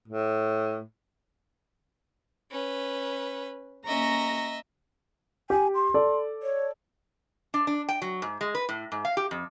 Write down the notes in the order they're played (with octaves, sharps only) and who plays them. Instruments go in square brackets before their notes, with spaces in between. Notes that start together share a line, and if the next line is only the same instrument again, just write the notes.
[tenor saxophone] A2
[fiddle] C#4 B4
[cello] A#3 C#4 [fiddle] D#5 E5 [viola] A#5
[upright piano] G4 [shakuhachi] G#5
[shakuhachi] C6
[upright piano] A4 D5
[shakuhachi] C#5
[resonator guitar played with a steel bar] D4
D4
G5
F#3
G#2
G#3
B4
A2
G#2
F5
G4
F2